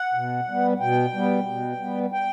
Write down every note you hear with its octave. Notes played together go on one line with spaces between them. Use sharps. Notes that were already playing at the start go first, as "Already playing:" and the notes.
Already playing: F#5
B2
G3 B3
B2 G5
G3 B3
B2
G3 B3
G5